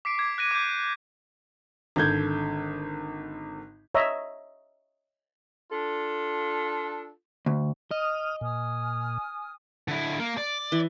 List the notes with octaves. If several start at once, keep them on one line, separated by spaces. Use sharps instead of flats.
D6 B6 C7 D7
D6 G#6 C7
F#6 A#6 D#7
D6 G6
G#1 D3 G6 G#6
C#5 D#5 E5 A#5
D4 F4 A4
D2
D#5 D#6 F6
A#2 G#5 D#6 F6
D3 E4
A#3
D5
E3